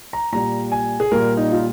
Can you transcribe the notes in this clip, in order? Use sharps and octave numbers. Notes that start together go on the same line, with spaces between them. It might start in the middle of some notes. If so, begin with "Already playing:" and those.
A#5
A#2 G3 A#5
G#5
G#4
A#2 G3 A#4
D#4
F4